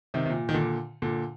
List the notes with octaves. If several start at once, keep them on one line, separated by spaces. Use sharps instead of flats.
C3 D#3
C3
A#2
D#3
A#2 D3
A#2 D3